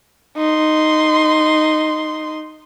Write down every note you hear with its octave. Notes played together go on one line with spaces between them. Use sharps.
D#4 C6